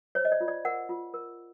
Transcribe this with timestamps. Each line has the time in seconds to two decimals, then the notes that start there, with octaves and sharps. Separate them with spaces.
0.15 C5 C#5
0.25 D#5
0.32 D5
0.41 F4
0.48 D5
0.65 A#4 F#5
0.89 F4
1.14 A#4